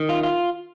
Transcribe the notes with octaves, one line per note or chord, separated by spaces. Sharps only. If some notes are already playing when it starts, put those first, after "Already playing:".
Already playing: D#3
F4
F4